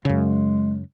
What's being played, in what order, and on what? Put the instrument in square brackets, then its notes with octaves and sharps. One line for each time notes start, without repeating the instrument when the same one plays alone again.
[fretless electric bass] F#2 C#3 [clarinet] G#3